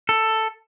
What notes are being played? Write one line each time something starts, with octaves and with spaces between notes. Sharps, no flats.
A4